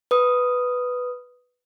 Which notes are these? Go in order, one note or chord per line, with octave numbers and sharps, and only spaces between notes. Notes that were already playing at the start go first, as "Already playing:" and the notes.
B4 D#6